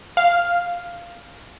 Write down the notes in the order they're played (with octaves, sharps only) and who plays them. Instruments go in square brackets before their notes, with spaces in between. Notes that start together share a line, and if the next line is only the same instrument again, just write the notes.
[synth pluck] F5